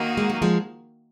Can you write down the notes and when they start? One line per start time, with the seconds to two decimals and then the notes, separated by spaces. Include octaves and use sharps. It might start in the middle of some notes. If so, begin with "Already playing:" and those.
Already playing: D#3 A#3 D#4 F#4
0.17 G#3
0.30 F#3
0.42 F3 G#3